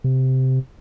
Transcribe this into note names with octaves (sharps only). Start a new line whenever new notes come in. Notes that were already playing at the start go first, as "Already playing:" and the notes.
C3